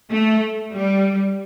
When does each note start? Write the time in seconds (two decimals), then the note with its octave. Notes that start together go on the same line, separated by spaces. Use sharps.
0.10 A3
0.72 G3